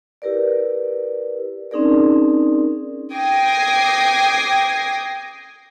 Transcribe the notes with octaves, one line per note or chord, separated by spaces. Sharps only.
E4 G4 A#4 B4 D5
C4 C#4 D#4 G#4 A#4 D5
G5 D6 D#6 G#6 A#6 C7